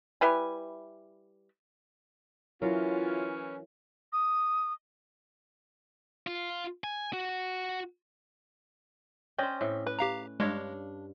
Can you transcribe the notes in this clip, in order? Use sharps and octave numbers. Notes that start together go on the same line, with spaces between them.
G3 E4 B4 G#5
E3 F#3 C#4 E4 F4 A#4
D#6
F4
G#5
F#4
C#4 C5 D5 D#5 G5
A2 C4 E5
B4
G4 F5 A#5
G2 G#3 D4 C#5 F5